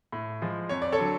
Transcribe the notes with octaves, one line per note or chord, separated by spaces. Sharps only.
A2
F3 G#3
F2 C#5
D5
A4 C#5
D3 F#3